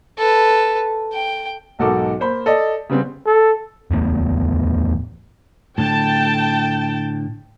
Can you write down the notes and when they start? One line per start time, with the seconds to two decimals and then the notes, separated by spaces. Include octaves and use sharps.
0.18 A4 B4
1.13 G5
1.79 B1 G#2 F#4 A4 A#4 D6
2.20 A#3 C5 B5
2.46 A4 D5 D#5
2.89 C#3 G3 B3 C4
3.26 A4
3.91 D1 E2 A2 B3
5.78 A2 D3 G5 A5